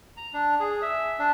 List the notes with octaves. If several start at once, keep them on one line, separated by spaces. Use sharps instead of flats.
A#5
D4
G#4
E5
D4